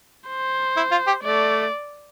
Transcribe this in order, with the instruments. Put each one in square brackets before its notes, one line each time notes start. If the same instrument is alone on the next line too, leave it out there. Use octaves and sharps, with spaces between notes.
[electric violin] C5
[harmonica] E4
F4
G4
[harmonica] A3 [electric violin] D5